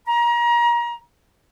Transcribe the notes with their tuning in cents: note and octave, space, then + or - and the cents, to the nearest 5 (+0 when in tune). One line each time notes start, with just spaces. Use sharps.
A#5 +30